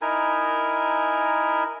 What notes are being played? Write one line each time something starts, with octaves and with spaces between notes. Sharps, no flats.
D#4 E4 A#4 G#5